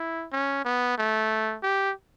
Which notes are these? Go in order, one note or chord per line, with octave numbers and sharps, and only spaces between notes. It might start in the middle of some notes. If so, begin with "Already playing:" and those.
Already playing: E4
C#4
B3
A3
G4